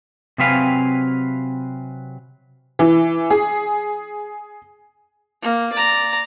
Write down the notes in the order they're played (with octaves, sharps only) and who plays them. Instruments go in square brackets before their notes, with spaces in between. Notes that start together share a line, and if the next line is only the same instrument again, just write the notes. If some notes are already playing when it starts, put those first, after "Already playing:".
[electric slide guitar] C3 F#3 C4 B4 F5 G#5
[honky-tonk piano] E3
G#4
[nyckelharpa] A#3
D5 A#5